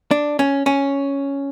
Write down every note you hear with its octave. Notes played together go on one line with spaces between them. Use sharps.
D4
C#4
C#4